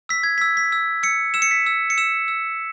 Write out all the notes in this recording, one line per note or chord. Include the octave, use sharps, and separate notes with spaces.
E6 B6
G#6
E6 B6
B6
E6
E6 C#7
E6 E7
C#7
B6
E6
C#7
E6 E7
E6